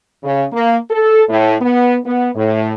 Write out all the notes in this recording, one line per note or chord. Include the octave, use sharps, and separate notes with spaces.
C#3
A#3
A4
A2
B3
B3
A2